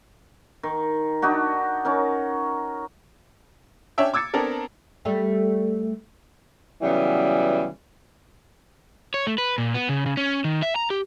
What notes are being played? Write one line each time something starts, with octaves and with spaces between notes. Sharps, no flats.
D#3
D4 D#4 F#4
C#4 D#4 A#4
C#4 D4 C#5 E5 G5
D6 E6 G#6 A6 C#7
B3 C4 D4 A4 A#4
G3 A3
C#3 E3 F#3 G3 B3
C#5
A3
B4
A#2
B3
C#3
C#3
C#4
D#3
E5
A#5
G4